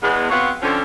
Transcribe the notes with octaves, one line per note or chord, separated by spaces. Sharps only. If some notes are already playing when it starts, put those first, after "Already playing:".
E2 G#3 B3
B3 C4 F#4 C#5 F5 F#5
D3 F3 C4 C#4